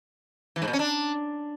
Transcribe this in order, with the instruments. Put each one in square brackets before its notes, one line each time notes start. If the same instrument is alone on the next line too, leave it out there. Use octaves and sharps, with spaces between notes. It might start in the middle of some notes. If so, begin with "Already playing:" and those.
[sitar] E3
G#2
A#2
C#4
D4